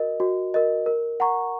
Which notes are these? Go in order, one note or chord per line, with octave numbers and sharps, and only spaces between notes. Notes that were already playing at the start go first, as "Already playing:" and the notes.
Already playing: F#4 A#4 D#5
F#4
A#4 D#5
A#4
F#5 A#5 C#6